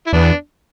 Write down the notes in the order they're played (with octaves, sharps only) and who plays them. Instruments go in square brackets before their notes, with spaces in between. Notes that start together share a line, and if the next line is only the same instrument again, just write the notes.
[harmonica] E4
[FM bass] E2 [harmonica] B3 D4